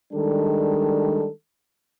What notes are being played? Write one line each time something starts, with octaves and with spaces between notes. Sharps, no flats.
D#3 G3 G#3 D4 A4